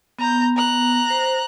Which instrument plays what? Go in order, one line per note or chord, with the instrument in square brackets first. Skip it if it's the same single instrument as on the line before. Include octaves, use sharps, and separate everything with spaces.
[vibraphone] B3 [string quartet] A#5 G6
[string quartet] A#5 F#6
[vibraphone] C5